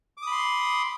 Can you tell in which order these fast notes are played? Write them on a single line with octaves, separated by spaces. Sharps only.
D6 D#6 B5 C6